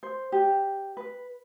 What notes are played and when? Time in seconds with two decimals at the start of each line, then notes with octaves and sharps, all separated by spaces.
0.03 C5
0.32 G4
0.97 B4